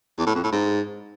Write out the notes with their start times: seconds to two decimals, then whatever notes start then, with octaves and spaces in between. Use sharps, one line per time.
0.18 E2
0.26 A2
0.35 F2
0.44 A2
0.52 G#2